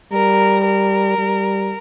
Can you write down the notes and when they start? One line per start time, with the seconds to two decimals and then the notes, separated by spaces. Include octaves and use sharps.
0.13 G3 A#4
0.65 A#4
1.18 G3